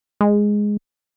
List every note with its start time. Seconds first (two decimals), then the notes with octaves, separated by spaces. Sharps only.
0.21 G#3